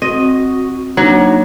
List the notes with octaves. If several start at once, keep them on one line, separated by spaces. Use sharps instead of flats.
C4 F#4 D#5
F#3 A#3 D4 D#4